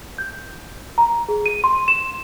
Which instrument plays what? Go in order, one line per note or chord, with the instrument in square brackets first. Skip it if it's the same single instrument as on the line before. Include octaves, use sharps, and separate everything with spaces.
[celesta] G6
A#5
G#4
D#7
C6
E7